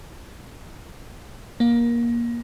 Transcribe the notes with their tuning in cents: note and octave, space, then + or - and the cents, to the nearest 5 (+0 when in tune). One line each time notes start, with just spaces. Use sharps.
A#3 +20